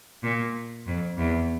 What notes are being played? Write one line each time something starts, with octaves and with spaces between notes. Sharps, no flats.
A#2
F2
E2